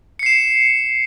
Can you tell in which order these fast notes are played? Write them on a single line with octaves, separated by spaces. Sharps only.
C#7 C7 E7